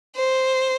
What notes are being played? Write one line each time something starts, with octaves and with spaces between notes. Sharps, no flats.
C5